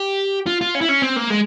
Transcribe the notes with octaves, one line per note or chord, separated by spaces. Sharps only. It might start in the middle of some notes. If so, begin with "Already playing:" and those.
Already playing: G4
F4
F4
C#4
E4
C#4
C4
A#3
G#3